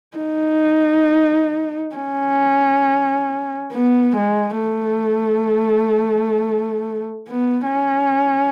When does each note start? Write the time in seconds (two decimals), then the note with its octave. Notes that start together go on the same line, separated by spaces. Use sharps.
0.17 D#4
1.95 C#4
3.72 B3
4.17 G#3
4.61 A3
7.29 B3
7.73 C#4